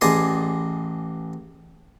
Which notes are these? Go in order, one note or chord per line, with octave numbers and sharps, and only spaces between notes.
A1 G#4 D5 D#5 C6